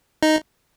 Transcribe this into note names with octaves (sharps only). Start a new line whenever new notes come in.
D#4